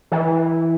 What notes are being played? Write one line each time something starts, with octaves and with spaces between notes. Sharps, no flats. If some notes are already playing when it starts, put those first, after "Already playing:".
E3